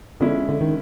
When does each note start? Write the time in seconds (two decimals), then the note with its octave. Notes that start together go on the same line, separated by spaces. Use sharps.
0.20 D3 F3 G#3 C#4 E4
0.49 D3
0.61 D#3